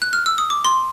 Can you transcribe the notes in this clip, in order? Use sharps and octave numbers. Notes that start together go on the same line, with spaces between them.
F#6
F6
E6
D#6
D6
C6